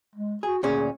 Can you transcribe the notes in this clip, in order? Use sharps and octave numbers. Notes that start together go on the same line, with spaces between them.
G#3
F#4 G#4
D2 A#2 C#4 G#4